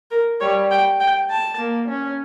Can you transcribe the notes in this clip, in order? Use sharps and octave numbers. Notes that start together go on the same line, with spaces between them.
A#4
G3 C#5
G5
G5
A5
A#3
C#4